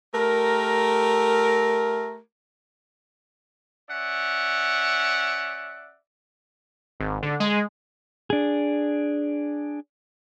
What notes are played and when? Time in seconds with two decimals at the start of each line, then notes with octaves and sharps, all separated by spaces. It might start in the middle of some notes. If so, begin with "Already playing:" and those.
0.14 A3 G4 A#4
3.90 C#4 D5 E5 F#5
7.00 G#1
7.22 D3
7.40 G#3
8.30 D4 G#4